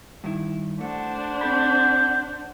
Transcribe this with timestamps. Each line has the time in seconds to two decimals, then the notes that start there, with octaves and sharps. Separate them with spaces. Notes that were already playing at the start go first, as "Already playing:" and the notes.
0.24 G2 D#3 E4
0.81 A3 D4 C5 F#5
1.41 C4 A4 B5 G6